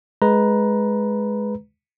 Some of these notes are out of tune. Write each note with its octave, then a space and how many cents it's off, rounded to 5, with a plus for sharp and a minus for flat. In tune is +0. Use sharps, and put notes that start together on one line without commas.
G#3 +15 B4 +0 A#5 +10